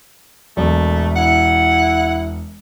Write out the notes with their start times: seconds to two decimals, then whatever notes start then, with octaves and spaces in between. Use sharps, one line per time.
0.57 E1 A3
1.16 E4 F#5